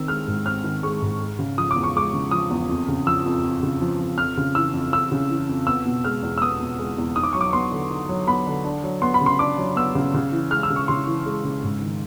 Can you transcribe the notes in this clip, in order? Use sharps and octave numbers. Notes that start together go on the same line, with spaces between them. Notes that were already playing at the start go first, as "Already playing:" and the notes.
Already playing: D#3 C4 E6
G#3 F6
G#2
C4 F6
D#3
G#3 C#6
G#2
G#3
C#3
F3 D#6
E2 D6
C#6
G#3 D6
C#3
F3 D#6
E2
F2
C#3
F3 E6
F2
F2
C#3
F3
F2
F2 F6
C#3
E3 E6
F2
F2 E6
C#3
E3
F2
B3 E6
B2
G#3 F6
E2
E6
B3 D#6
B2
G#3
E2
D#4 D#6
D6
F#3 C#6
D6
B3 C6
D3
D#4
F#3
B3 B5
D3
D4
F#3
B3 C6
B5
C#3
C6
D4 D6
F#3
B3 E6
C#3
C#3
E3
G#3 F6
E6
C#3
C#6
C#3 C6
E3
G#3
C#3
G#2
D#3